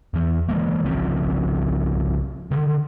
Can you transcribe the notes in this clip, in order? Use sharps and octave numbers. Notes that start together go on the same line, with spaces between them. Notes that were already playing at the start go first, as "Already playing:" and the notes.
E2 E3
E3 G#3 A#3
C2 C#3 F3 C4
D3 D#3